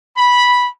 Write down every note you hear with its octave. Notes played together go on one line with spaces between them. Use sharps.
B5